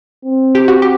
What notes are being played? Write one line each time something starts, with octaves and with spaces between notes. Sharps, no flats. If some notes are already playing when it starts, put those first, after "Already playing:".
C4
G4
F#4
G4